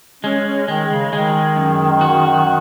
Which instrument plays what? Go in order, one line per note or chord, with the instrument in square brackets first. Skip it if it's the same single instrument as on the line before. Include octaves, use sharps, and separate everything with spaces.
[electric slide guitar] G#3 [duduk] C#4
[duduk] C#4
[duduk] D#3 [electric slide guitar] G#3
[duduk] C#3
[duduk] D#3 [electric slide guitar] G#3
[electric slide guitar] F#2
F#4